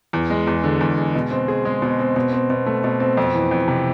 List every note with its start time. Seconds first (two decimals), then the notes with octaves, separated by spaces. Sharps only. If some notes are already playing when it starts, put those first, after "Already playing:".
0.13 E2
0.30 G#3
0.47 E2
0.64 D3
0.81 E2
0.98 G#3
1.15 B2
1.31 C4
1.48 G#4
1.65 G#3
1.82 B2
1.99 C4
2.16 B2
2.33 C4
2.50 B2
2.66 A3
2.84 B2
3.00 C4
3.17 F2
3.34 E3
3.51 F2
3.68 C3